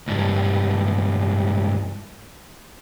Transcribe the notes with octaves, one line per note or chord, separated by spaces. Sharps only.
C#2 G2